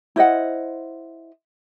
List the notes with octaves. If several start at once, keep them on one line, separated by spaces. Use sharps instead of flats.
E4 C5 D#5 F#5